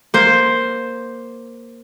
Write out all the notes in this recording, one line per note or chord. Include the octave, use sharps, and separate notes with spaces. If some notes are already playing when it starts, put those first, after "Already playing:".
A#3 C5